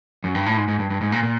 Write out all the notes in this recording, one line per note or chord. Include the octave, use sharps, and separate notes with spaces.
F#2
G2
A2
G#2
G#2
G2
G2
G#2
A#2
A#2